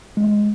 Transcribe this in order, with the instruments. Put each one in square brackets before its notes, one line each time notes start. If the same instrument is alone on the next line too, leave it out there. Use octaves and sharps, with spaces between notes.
[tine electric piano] G#3